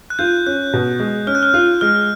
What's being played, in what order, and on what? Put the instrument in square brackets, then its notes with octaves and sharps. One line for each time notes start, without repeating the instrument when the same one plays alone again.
[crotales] F#6
[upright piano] F4 [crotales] G6
[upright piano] C#4 [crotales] F#6
[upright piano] B2
G#3
[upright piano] C#4 [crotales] F6
[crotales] F#6
F6
[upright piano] F4
[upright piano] G#3 [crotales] F6